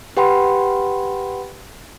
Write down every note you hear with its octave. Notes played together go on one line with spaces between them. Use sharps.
G4 B4 F#5 G5 B5 C6